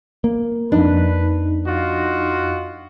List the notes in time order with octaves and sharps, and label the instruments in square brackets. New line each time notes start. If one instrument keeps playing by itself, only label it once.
[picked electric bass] A#3
[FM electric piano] F2 D#4 [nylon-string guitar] D4 [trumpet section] B4
[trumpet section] F4 F#4 D#5